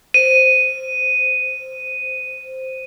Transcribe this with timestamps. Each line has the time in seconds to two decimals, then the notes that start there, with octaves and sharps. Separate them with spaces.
0.14 C5 D#7